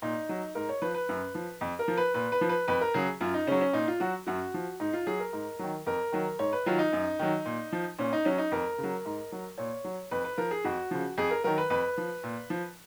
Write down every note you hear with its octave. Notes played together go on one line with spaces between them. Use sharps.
A#2 D#4
F#3
G#2 A#4
C#5
F3 B4
B4
F#2
F3
F2
A#4
F3
B4
A#2 B4
B4
F3
B4
F2 B4
A#4
C#3 F#3 G#4
F#2 F4
D#4
C#3 F#3 C#4
C#4
A#2 D#4
F4
F#3 F#4
F#2 F#4
F3
G#2 D#4
F4
F#3 G#4
A#4
G#2
D#3 F#3
F2 A#4
D#3 F#3
G#2 C#5
B4
D#3 F#3 F4
D#4
F#2
D#3 F#3
A#2
F3
A#2 C#4
D#4
F#3 C#4
D#4
F2 A#4
C#3
F#3
G#2
F#3
A#2 C#5
F#3
F2 B4
B4
F3 A#4
G#4
F2 F#4
C#3 F3
F2 G#4
A#4
D#3 F#3 A#4
B4
F2 B4
F3
A#2
F3